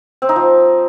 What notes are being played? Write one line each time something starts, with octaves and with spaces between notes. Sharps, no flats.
C4
D#4
F3